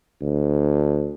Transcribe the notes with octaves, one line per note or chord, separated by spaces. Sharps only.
D2